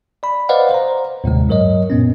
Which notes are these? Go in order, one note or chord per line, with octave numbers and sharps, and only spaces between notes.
D5 B5
B4 C5 D5 D#5 F5 F#5
C5 A#5
D#2 A2 C3 G#3
G2 F#3 A#4 C#5 D#5
F#2 A#2 B3 C#4